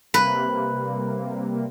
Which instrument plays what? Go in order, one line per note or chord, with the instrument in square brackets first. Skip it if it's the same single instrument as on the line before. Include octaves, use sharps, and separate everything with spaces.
[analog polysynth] C3 G3 A#3 [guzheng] B4